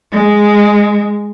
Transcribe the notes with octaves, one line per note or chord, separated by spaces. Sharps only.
G#3